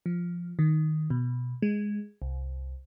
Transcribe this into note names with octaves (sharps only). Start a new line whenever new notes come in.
F3
D#3
B2
G#3
C2